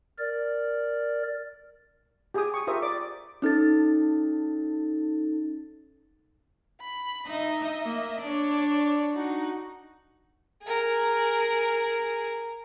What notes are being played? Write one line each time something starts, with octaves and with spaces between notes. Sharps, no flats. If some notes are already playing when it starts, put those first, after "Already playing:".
A#4 D5
G4 G#4 G5 G#5 D#6
C#6 D#6
F4 G4 A#4 C5 E5 D#6
D5 D6
C#4 D#4 A4 A6
B5
D#4 D#5 E5
A#3
D4 C#5 D5
D#4 F#4
G#4 A#4